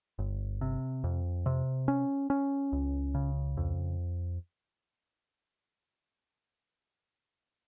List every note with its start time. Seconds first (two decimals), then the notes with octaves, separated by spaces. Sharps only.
0.19 G1
0.61 C3
1.04 F2
1.46 C3
1.88 C#4
2.30 C#4
2.72 C#2
3.15 C#3
3.57 F2